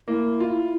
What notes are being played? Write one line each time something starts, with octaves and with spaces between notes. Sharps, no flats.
A#3 E4
F4